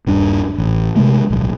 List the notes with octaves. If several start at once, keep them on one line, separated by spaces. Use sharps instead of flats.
D#1 G2 D4
A1
C3 F3 G#3 A3
D1 B1